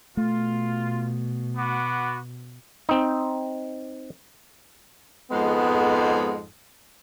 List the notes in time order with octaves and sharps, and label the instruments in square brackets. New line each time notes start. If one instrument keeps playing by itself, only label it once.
[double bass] B2 [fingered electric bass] A3 [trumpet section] F4
[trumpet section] B3 F#4 D6
[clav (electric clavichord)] C4 D#4
[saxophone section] F2 G#2 G#3 [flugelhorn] B3